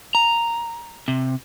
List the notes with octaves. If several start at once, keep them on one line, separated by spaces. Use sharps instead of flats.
A#5
C3